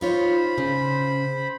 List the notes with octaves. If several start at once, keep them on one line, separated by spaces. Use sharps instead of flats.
D#4 F4 C5 C#5 B5
C#3